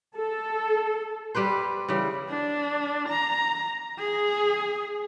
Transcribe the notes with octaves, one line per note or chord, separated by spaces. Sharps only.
A4
G3 G4 B4 C5
C#3 E3 G3
D4
A#5
G#4